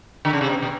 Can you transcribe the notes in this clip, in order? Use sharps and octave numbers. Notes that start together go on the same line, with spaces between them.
D3
C#3
C3
B2
B2